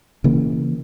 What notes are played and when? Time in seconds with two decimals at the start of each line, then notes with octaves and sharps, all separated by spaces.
0.24 C#3 E3 A#3